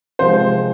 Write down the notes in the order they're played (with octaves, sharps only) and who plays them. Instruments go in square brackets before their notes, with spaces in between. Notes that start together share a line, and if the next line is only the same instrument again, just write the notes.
[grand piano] C3 F3 G#3 C5